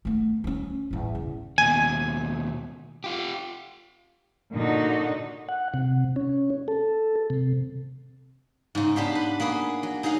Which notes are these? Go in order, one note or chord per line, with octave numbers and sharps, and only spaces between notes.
A3 B3
C4 C#4
A1 E2
C#3
D#2 B2 G#5
F4 G4
A#2 D3 D#4 F#4
F#5
C3
C#4
A4
C3
G#2 C#3
B3 D4 G4 F5
B4
A#3 B3 G#4 B4
F#3
D#4 G#4 D#5 F5 F#5